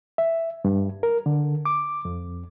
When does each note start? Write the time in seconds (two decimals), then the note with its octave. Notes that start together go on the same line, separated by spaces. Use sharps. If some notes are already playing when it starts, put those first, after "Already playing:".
0.18 E5
0.65 G2
1.03 A#4
1.26 D3
1.65 D6
2.05 F2